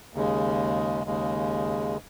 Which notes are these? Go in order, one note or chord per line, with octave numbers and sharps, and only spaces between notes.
D#2 C#3 G#3
D#2 C#3 G#3